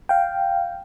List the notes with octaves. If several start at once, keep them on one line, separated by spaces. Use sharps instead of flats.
F5 G5